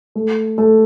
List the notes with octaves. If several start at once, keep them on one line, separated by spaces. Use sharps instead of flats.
A3
A3